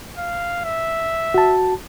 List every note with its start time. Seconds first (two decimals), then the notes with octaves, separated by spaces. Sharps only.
0.18 F5
0.65 E5
1.34 F#4 A5